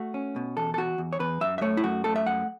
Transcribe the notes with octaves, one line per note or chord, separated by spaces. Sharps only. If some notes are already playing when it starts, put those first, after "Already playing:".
Already playing: A3 F#4
C#4
B2
E2 A4
A4
E2 F#4
E2
C#5
E2 B4
F#2 E5
E5
A3 C#5
E4
F#2 F#4
A3 A4
E5
F#2 F#5